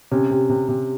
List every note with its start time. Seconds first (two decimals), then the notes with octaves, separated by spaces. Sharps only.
0.11 C3 C#4
0.31 C3
0.50 C3
0.68 C3